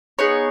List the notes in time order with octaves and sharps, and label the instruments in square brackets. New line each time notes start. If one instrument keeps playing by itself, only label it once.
[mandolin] B3 D#4 G#4 C#5